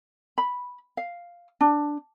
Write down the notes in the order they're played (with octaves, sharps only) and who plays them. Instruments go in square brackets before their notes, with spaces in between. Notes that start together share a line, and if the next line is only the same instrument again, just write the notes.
[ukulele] B5
F5
D4